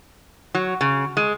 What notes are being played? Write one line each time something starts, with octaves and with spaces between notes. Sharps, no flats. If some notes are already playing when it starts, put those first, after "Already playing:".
F#3
C#3
G#3